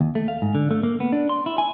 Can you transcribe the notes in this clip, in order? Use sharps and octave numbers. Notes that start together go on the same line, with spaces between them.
D#2
A3
F5
G#2
D3
A3
A#3
B3
D4
C6
E4
G#5